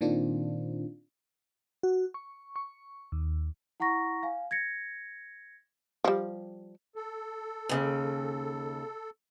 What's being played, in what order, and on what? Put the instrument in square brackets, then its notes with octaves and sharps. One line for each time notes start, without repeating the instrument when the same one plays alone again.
[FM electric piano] A#2 D#3 C4 D4 F4
F#4
C#6
C#6
D#2
[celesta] E4 F#5 A#5 C#6 A#6
F5 G#5
G#6 A#6 C#7
[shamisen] F3 G3
[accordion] A4
[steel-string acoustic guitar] D#2 C#3